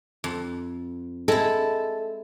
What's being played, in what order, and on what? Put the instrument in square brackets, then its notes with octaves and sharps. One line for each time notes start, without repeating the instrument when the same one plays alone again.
[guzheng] F2
[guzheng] G#3 E4 [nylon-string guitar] A4